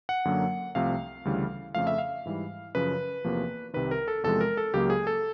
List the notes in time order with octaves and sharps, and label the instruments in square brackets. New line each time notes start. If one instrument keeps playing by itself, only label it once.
[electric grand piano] F#5
F#2 D3 F#3 A#3
C2 C3 F3 A3 F5
D2 C#3 E3 G3
F2 C#3 F3 A3 F5
E5
F5
G#2 E3 G3
F#2 C#3 F3 B4
E2 C3 F3 A#3
C2 C3 D#3 B4
A#4
A4
E2 C3 F3 G#3 A4
A#4
A4
C#2 C#3 F#3 A#3 G4
G#4
A4